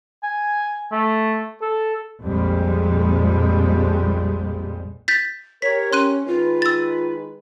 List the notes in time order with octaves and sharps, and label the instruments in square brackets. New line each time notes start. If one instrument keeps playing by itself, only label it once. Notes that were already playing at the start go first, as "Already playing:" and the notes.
[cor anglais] G#5
A3
A4
[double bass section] A#1 F2 G3 G#3
[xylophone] G6 A6 B6
[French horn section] G4 A#4 [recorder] C#5 [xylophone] B6
[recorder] C#4 [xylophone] C6 F#6 D#7
[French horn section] D#3 G#3 B4 [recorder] F4
[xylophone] E6 A6